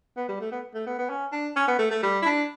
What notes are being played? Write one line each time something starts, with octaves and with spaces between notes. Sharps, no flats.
B3
G3
A3
B3
A3
B3
B3
C#4
D4
C#4
B3
A3
A3
G3
E4
D4